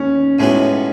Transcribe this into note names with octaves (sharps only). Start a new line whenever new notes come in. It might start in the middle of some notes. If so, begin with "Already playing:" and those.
Already playing: D#2 C#4
B1 A2 G#3 B3 F#4